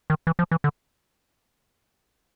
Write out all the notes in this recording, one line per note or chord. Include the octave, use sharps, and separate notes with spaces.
D#3
E3
F3
E3
D3